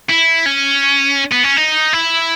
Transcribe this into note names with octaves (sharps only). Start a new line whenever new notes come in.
E4
C#4
B3
C#4
D#4
E4